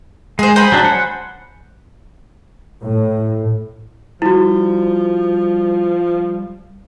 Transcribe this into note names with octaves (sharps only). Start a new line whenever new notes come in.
G#3 G#4 C5
C5 G#5 B5
F#3 D4
F#5
A2
F3 G3 E4 F#4